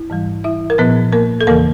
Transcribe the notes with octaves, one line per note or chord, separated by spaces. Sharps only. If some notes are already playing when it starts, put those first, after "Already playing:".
Already playing: E4
G#2 E3 G3
E4 E5
A#4
A#2 F3 B3 B4
A#3 A#4
A4
E2 C#3 E3 A#3 A#4